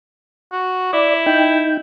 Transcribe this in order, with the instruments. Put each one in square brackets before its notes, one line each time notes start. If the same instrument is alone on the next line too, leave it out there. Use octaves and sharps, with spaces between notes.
[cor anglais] F#4
[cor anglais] E4 [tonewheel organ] D5
[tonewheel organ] D#4 G5